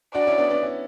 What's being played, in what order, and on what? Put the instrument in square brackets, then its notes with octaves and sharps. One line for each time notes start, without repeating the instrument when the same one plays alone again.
[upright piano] D4 F#4 [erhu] D5
[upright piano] C#4 E4
B3 D4
B3 D4
C#4 E4